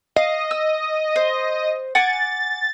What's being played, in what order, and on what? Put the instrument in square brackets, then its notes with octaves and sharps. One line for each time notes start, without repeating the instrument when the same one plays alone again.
[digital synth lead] D#5 [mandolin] F5
[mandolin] E6
C5
[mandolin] F#5 G#5 D6 [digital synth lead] A6